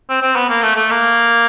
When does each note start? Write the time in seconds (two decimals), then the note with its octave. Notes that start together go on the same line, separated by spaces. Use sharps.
0.09 C4
0.22 C4
0.36 B3
0.49 A#3
0.63 A3
0.76 A3
0.90 A#3